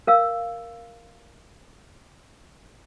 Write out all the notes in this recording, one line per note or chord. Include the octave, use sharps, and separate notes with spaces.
A#4 F5 E6